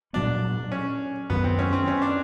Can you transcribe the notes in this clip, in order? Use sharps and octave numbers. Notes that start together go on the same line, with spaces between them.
A#2 F#3 B3 D4
C#4
F#2 D#3 F#3 B3
C4
C#4
C4
C#4
D4